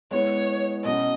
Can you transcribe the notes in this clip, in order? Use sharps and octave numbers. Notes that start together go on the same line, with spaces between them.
G#3 B3 E4 C#5
B2 F#3 C#4 D#5